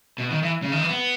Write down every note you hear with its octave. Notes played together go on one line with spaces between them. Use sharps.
B2
D#3
E3
C#3
D#3
E3
B3